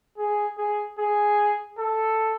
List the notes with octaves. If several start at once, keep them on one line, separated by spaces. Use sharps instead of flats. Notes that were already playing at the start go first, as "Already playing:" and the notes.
G#4
G#4
G#4
A4